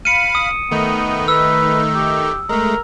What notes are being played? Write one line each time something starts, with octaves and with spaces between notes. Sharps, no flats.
F5 B5 C#7 D#7
D#6
D#3 A3 B3 D#4
B4 E6
G4
G#3 A3 A#4